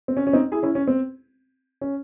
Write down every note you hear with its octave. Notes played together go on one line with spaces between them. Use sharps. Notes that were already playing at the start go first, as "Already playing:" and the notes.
C4
C#4
C#4
C4 D#4
E4 G#4
C#4 E4
C#4
C4
C#4